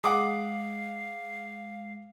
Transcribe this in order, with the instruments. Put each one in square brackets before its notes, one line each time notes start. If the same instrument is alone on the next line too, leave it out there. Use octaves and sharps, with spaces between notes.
[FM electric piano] G#3 [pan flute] F5 [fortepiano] F#5 D6 D#6